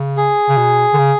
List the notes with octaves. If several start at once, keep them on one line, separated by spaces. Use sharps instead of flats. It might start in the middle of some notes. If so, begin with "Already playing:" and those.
Already playing: C#3
G#4
C#3
B2
D3
C#3